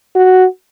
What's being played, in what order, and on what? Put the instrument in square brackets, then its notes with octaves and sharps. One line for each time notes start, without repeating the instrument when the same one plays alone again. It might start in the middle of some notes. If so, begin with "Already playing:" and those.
[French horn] F#4